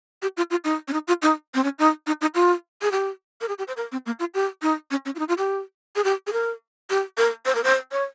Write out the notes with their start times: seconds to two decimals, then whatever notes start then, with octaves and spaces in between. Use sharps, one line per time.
0.22 G4
0.37 F4
0.51 F4
0.65 D#4
0.88 C#4
0.93 D#4
1.08 F4
1.22 D#4
1.55 C4
1.64 C#4
1.79 D#4
2.07 D#4
2.21 D#4
2.35 F4
2.82 G#4
2.92 G4
3.41 A#4
3.48 G#4
3.58 G4
3.68 C5
3.77 A#4
3.92 C4
4.06 A#3
4.20 F4
4.34 G4
4.62 D#4
4.91 C#4
5.06 C#4
5.15 F4
5.19 D#4
5.28 F4
5.38 G4
5.96 G#4
6.04 G4
6.27 G#4
6.33 A#4
6.90 G4
7.18 A#4
7.46 C5
7.55 A#4
7.64 C5
7.92 C#5